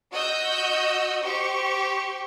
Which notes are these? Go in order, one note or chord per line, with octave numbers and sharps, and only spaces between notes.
F#4 D#5 E6 G6
G4 C5 C#6